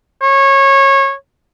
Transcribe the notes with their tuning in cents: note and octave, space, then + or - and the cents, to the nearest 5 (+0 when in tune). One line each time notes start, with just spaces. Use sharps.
C#5 -20